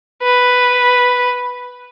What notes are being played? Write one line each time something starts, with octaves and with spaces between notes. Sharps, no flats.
B4